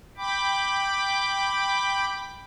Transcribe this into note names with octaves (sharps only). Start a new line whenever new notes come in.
G5 B5 D6